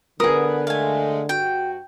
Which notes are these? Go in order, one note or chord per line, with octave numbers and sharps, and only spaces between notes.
D3 B3 G#4 A#4 B4 D#6
G#3 A3 F5 G#5
G2 F#4 G5